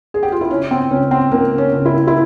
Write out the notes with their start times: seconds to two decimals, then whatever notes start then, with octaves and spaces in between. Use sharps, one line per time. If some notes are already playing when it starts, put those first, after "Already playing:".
0.14 G#4
0.23 G4
0.32 F4
0.41 E4
0.50 C#3 C#4
0.71 C4
0.90 C#2 C#4
1.11 C4
1.31 C#2 A#3
1.58 C#4
1.73 C#2
1.86 E4
2.08 E4